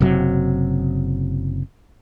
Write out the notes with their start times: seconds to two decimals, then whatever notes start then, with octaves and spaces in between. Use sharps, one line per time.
0.01 F#1 C3 F#3